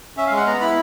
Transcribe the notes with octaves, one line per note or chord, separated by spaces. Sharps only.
C#4 E5
F5
G#3
F#5
B3 A#5
E4 B5